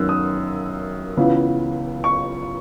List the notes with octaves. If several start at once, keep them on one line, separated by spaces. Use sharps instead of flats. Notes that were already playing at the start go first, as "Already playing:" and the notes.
Already playing: F#2 D#3 B3 E6 F#6
D#6
C#2 C#3 E3 B3
C#6